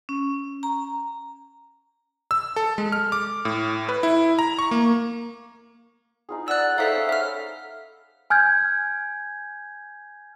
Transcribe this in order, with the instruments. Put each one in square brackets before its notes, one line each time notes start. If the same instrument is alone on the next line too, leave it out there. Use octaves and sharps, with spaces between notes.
[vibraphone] C#4
A#5
[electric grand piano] E6
A4
G#3
F6
D6
A2
B4
E4
A#5
C#6
A#3
[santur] D#4 F4 G#4
[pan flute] D5 [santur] E5 F#5 [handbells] E6 F#6
[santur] D#4 C5 C#5 [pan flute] A4 [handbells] E5 F5
[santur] C#4
[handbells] E5 F6 [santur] A5 B5
[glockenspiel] G#5 F6 G6 G#6